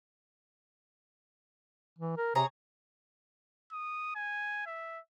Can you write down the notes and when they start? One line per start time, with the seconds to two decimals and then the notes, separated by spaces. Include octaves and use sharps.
1.99 E3
2.17 A#4
2.35 C3 G#4 C#5 A#5
3.72 D#6
4.15 G#5
4.66 E5